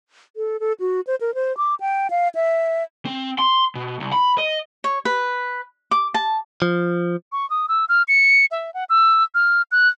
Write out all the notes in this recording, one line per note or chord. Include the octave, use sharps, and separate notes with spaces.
A4
A4
F#4
C5
A#4
C5
D6
G5
F5
E5
C4
C6
B2
C2
B5
D#5
C#5
B4
D6
A5
F3
C#6
D#6
E6
F6
C#7
E5
F#5
E6
F6
F#6